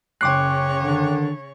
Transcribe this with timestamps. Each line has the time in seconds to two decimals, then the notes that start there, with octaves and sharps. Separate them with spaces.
0.21 F#1 C#3 C#5 G5 C6 D6 F#6 C7
0.83 D3 D#3 D4